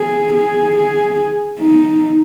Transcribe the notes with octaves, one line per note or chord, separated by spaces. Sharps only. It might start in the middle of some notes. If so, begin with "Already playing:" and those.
Already playing: G#4
G#4
G#4
D#4